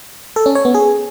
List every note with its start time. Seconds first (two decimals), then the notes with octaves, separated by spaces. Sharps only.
0.36 A4
0.46 C#4
0.55 C#5
0.65 B3
0.75 G#4